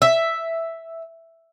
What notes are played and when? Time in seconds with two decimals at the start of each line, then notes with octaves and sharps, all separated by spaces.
0.02 E5